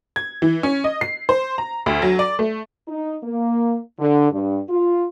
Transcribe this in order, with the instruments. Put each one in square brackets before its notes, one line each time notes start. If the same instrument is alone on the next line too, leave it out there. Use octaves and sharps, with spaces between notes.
[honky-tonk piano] G#6
E3
C#4
D#5
C7
C5
A#5
D2
F#3
D5
A3
[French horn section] D#4
A#3
D3
G2
F4